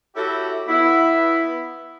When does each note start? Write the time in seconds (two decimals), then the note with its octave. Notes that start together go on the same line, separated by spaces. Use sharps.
0.16 E4 F#4 G4 A4 C#5 E5
0.68 B3 E4